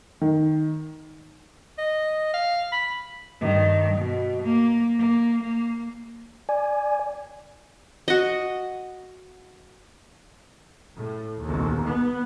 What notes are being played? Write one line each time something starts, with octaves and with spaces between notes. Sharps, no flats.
D#3
D#5
F5
B5
G2 D#3
B2
A#3
A#3
A#3
D5 G#5
F#4 D#5
A2
D#2
B3